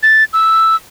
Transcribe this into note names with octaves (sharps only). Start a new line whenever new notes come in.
A6
E6